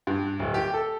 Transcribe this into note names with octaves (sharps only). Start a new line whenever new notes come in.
G2
D1
G4
A4